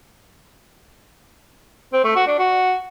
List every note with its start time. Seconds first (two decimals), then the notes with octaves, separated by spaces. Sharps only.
1.93 C4
2.04 A3
2.16 F#4
2.27 D4
2.39 F#4